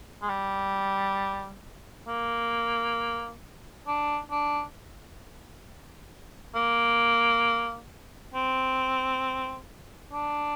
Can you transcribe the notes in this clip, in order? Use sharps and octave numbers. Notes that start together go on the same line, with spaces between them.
G#3
G3
A#3
D4
D4
A#3
C4
D4